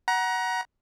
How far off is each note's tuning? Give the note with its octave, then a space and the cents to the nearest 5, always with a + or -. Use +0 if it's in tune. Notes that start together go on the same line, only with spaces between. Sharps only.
F#5 +10 A#5 +30